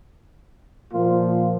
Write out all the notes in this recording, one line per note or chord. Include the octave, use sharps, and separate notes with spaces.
A#2 F3 A#3 F4